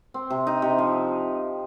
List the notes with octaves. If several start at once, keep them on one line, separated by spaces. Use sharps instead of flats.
C4
C3
D#4
C3
F3